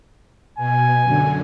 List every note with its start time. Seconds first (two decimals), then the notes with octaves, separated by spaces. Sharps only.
0.57 B2 G#5
1.03 F#2 D3